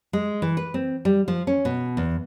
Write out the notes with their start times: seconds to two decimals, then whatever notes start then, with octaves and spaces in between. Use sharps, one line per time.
0.13 G#3
0.42 E3
0.57 B4
0.74 C4
1.05 G3
1.28 F3
1.47 C#4
1.65 B2
1.97 E2